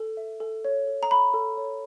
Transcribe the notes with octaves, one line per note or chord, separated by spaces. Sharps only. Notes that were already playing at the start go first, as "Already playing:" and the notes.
Already playing: A4
E5
A4
C#5
A4
A#5
E5 B5
A4
C#5